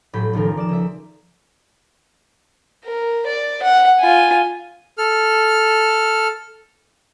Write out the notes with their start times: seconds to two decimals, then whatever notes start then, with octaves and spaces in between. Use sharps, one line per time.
0.13 A1 A2 F#3 B5 G6
0.33 F1 C#2 D#3 F3 A#4
0.57 D5 E7
0.69 C#2 E5
2.84 A#4
3.26 D5
3.62 F#5
4.00 F4 G#5
4.98 A4 F6